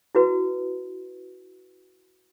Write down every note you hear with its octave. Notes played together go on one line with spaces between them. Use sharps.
E4 F#4 B4